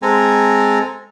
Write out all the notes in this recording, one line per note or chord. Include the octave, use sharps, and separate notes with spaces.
G#3 C4 A4 G#5 A#5